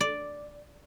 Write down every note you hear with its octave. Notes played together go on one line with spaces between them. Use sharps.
D5